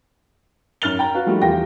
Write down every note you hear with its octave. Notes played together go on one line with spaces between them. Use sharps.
F#2 D#4 F6 A6 F7 G7
G5 A#5
F#4 B4 F5
F3 G3 A3 A#3 D#4 F#4
E2 E4 F4 G4 G5 A#6